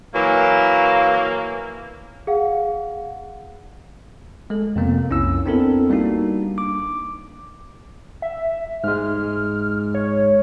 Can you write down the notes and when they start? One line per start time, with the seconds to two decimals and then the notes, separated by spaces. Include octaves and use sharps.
0.14 E3 F#3 A#3
2.27 G#4 F5 F#5
4.50 G#3 A4
4.76 F2 C3 A#3 B3
5.09 B1 F2 C#4 E4 E6
5.46 B3 C4 D4 E4 A4 A#4
5.90 G3 A#3 D4 D#4 F#4
6.58 D6
8.22 E5
8.84 G#2 G#3 F6
9.94 C#5